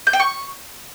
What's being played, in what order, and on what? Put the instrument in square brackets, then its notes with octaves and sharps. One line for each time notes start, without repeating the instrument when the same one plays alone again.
[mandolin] G6
G5
C#6